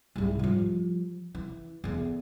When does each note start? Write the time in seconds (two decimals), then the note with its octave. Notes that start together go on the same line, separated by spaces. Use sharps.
0.16 C2 G#2
0.39 F3 G3
1.35 E3
1.84 E2 D3